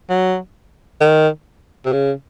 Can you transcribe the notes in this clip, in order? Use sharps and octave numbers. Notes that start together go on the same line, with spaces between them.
F#3
D#3
C3
C#3